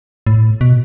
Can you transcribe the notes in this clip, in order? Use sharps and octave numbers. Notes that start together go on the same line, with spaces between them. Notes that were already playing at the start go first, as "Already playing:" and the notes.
A2
B2